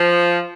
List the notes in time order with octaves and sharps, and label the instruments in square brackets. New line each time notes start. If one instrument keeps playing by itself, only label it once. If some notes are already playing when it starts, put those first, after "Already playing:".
Already playing: [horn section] F3